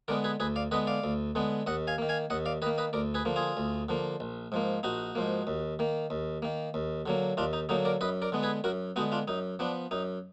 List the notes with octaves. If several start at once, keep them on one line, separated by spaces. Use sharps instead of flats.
D3 G#3 B3 A#4 D5
G#4 B4
D2 G#4 B4
D5 F5
D3 G#3 B3 B4 D#5
D5 F5
D2
D3 G#3 B3
D#2 D#5 F#5
F5 G#5
D#3 A#3
F5 G#5
D#2 D#5 F#5
D5 F5
D#3 A#3 B4 D#5
B4 D#5
D2 A#4 D5
G#4 B4
D3 F3 A#3
F4 G#4
D2
D3 F3 A#3
A#1
G#2 F3 A#3
A#1 D#4 F#4
G#2 F3 A#3
D#2
D#3 A#3
D#2
D#3 A#3
D#2
D3 F#3 A#3
D#2 D4 F4
D#4
D3 F#3 A#3 D#4
A#4 D5
F#2 B4 D#5
A#4 D5
D3 G#3 B3
G#4 B4
F#2 F#4 A#4
D3 G#3 B3 D#4 F#4
D4 F4
F#2 D#4
F3 B3 D4
F#2 D#4